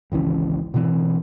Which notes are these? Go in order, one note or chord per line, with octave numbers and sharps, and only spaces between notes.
G#1 C#2 E3 C#4
B2 D3 E3 C4